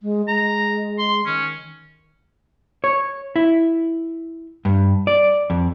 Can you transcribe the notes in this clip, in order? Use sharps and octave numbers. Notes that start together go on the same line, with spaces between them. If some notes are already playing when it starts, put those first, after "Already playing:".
G#3
G#3 A#5
C6
D#3 C#4
C#5
E4
G2
D5
F2